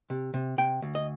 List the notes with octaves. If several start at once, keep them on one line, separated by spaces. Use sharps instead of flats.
C3
C3
C3 G5
D2
D#5